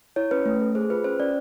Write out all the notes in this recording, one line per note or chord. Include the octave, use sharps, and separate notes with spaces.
E4 C#5
C#4 B4
A3
A4
G#4 C5
F4 B4
C#4 C5
C#4 D5